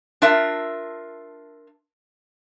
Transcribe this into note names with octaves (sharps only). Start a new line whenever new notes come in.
D4 F4 A#4 E5